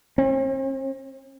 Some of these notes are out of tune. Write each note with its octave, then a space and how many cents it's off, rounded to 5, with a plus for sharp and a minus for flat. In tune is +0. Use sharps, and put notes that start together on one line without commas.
C4 +45